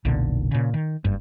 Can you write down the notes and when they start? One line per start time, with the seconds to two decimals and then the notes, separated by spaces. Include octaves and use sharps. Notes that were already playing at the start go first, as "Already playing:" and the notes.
0.05 F1 B1 A#2 D3
0.51 A#2 C#3
0.74 D#3
1.05 F#1 G2